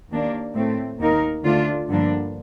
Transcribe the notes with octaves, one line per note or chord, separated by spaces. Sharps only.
D#2 D#3 A#3 D4
A2 A3 C4
D#2 D#3 A#3 D#4 A#4
D2 D3 A3 D4 F4
G2 D3 F3 A#3 D4